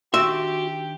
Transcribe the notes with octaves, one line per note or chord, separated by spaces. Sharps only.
D#3 D4 F#4 G4 E5 C6